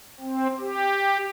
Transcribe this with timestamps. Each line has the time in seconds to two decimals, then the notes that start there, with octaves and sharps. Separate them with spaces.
0.20 C4
0.60 G4